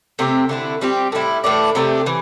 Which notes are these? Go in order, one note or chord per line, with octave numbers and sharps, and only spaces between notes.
C3 A3 C4 G4
D3 A3 E4
G3 C4 G4
A2 G3 E4
A2 E3 A3 D4
C3 A3 D4 G4
E3